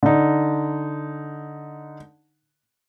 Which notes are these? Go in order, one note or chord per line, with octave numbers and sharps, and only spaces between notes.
D3 D#4